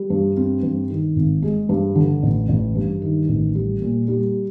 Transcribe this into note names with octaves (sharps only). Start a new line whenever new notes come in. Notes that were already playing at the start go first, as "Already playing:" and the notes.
Already playing: G3
G2
C4
G2
D#3
G#1
G#3
G2
D3
A1
A1
G2
D#3
A1
G3
A#2
G3